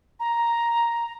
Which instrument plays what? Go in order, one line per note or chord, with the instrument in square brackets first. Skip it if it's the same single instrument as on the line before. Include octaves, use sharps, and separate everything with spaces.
[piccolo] A#5